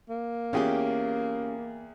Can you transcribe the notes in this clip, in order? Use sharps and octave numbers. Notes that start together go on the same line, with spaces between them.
A#3
E2 C#4 F4 G4 G#4 G5